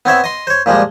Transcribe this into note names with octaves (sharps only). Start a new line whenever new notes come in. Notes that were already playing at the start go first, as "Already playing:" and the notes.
B3 C4 C#5 E5
D#5 C6
C5 C#5
A#2 F3 G3 G#3